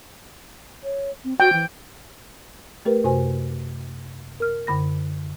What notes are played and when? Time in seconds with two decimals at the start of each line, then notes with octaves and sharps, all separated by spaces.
0.84 C#5
1.24 C4
1.40 F#4 G5
1.53 E3
2.85 A3 G4 A#4 B4
3.04 F#2 C3 F#4 C5 G#5
4.40 A#4 F6
4.67 F#2 D3 B5 A#6